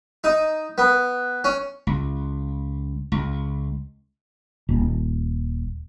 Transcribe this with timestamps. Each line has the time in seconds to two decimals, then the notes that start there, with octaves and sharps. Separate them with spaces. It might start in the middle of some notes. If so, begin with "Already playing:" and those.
0.24 D#4
0.78 B3
1.44 C#4
1.87 C#2
3.12 C#2
4.69 D#1